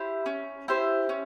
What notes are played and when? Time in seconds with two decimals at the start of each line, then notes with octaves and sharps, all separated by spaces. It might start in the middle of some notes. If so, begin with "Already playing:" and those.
Already playing: E4 G4 C5
0.26 C#4
0.68 E4 G4 C5
1.09 C#4